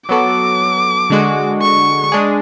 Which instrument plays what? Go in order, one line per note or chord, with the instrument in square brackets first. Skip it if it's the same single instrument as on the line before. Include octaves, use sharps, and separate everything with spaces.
[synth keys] F#3 B3 F#4 A4 [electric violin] D6
[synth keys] D3 G#3 D4 F#4
[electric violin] C#6
[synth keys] G#3 D4 G#4